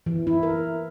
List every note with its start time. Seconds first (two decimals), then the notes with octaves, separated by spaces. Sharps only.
0.06 E3
0.27 E4
0.43 A#4